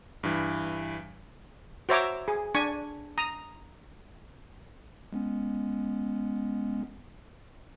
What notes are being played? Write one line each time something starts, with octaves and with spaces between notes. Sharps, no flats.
G2 E3
F#4 C5 C#5 E5 A#5 D6
G#4
D4 G#5 C#6
A#5 D#6
G#3 B3 C#4